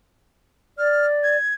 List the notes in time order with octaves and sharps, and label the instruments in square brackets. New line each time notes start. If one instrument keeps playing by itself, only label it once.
[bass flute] D5 [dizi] F6
[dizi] G#6